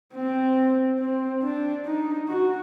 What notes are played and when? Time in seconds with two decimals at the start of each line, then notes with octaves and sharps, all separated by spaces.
0.14 C4
1.00 C4
1.43 D4
1.85 D#4
2.29 F#4